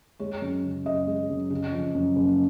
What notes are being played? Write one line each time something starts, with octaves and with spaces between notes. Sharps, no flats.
G#3 C#5
F#2
C#3
F#2 D#5
G#3
F#2
C#3
F3
F#2
F#1